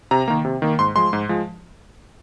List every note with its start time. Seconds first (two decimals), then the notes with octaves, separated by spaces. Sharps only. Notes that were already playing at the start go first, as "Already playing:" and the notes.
0.11 C3 A#5
0.28 D#3 A#3
0.45 C3
0.62 D#3 A#3
0.79 G#2 C6
0.96 F3 G#3 C6
1.13 G#2
1.29 F3 G#3